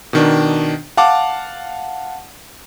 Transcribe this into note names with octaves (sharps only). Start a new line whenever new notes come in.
B2 D#3 D4
F5 F#5 A5 D6